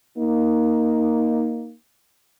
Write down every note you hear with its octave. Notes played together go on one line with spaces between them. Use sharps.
A#3 D#4